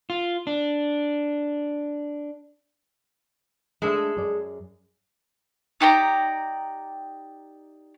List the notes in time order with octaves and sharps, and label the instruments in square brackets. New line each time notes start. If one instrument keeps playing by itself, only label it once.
[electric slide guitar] F4
D4
[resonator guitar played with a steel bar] G#3 A4 [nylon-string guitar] A3 D4 E5
[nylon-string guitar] F#2 G#4 D5
[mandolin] D#4 G4 D5 A#5